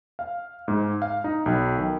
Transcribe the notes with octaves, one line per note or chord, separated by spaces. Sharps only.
F5
G#2
F5
D#4
B1
D#3